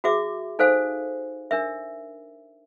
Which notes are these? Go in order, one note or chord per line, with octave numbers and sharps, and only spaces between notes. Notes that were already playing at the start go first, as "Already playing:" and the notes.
F#4 G#4 E5 D6
D#4 A4 C5 F5 G#5
D4 A#4 E5